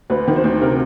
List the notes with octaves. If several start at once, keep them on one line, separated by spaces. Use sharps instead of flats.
D2 B4
D#3
C5
D2
C3 A#4